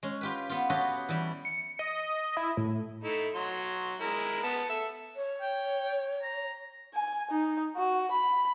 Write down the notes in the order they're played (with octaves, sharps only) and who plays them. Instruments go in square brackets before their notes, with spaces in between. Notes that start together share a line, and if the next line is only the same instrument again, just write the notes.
[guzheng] G#3 C#4
F4 G4 B4
B3 F4
F#4 G4 A4 B4 C#5 D#5
E3 G3
[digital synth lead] C#7
D#5
E4
A2
[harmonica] A3 D#4 E4
F#3 C6
G#3 E4 A#4
B3 A5
A4 E5
[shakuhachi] C#5
[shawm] G5
A#5
[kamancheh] G#5
D#4
F#4
B5